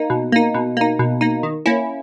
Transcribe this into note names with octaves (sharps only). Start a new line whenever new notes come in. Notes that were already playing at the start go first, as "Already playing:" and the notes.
Already playing: A#3 D#4
B2
A#3 D#4
B2
A#3 D#4
B2
A#3 D#4
D#3
A#3 C#4 E4